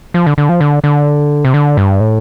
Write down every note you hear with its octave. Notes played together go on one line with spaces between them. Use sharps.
F3
D3
D3
F3
D3
D3
C3
D3
G2
A2